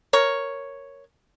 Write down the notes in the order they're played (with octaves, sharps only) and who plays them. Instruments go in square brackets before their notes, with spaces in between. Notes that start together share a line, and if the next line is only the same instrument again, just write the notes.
[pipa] A#4 C#5